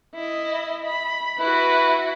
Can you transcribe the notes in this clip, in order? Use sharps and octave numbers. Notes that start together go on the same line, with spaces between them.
E4 D#5
B5
E4 F#4 B4